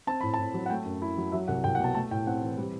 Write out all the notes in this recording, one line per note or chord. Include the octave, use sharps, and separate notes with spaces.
C4 A5
A2 B5
A5
A2
F#3
F#5
A3 G5
F#2
E4
F#3
F#3 E5
C2 F#5
C2 G5
F#5
B2 A5
A3 A5
A2 G5
C4 F#5
E3
G3